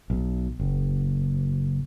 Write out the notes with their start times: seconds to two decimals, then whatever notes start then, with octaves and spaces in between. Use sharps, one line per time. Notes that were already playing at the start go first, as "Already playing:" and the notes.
0.10 B1
0.59 F#1